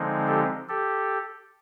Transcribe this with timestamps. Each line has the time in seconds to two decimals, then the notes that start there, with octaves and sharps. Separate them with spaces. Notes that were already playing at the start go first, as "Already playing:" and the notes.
Already playing: D3 F3 G#3 C4 D#4
0.27 G4 A4
0.69 G4 A4